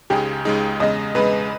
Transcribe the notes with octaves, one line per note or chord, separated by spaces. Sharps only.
C#2 C#3 G#3 D#4 G4 G#4
C#2 C#3 G#3 D#4 G#4
E2 C#3 G#3 D#5
E2 C#3 G#3 B4